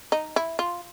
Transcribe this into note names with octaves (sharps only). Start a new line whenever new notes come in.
D#4
E4
F4